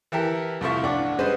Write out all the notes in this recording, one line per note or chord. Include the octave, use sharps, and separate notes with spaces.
E3 E4 G4 A4 A#4
C2 F2 F3 A3 E4 C#6
A1 D4 F#5 D6
G3 G#3 C#4 B4 C5 D#5